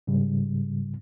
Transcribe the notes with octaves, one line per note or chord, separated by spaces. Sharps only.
G#2 C#3 G3